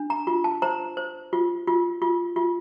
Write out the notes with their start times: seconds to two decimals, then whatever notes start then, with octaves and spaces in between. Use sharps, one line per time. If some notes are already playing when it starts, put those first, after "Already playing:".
Already playing: D4
0.10 A#5
0.27 F4
0.44 A5
0.62 C5 A#5
0.97 C5
1.33 F4
1.67 F4
2.02 F4
2.36 F4